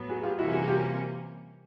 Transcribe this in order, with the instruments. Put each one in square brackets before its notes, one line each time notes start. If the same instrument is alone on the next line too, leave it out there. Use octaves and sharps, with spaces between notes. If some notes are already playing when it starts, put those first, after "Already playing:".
Already playing: [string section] A2 F#3 B3
[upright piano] F#4 G#4
F4 G4
[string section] C3 E3 G3 A#3 C#4 [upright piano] E4 F#4
[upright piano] F#4 G#4
F4 G4